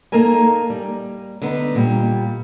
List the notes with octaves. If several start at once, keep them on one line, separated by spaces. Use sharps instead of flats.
A#3 D#4 A4 A#4 G#5
G3
D3 B3 D#4
A#2 G3